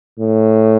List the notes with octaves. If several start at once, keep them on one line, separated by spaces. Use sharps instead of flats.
A2